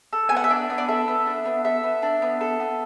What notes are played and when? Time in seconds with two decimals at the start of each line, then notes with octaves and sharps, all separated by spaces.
0.13 A4
0.29 B3 G#5
0.37 F#5
0.44 E5
0.50 D4 D5
0.70 B3
0.78 D5
0.88 A4 E5
1.08 B3
1.26 D4
1.45 B3
1.64 A4 E5
1.83 B3
2.02 D4
2.22 B3
2.41 A4
2.60 B3